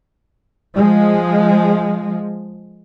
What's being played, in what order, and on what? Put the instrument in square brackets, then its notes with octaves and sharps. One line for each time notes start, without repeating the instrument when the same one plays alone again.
[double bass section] F3 G#3